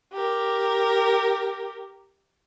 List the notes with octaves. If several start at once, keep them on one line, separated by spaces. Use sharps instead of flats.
G4 A#4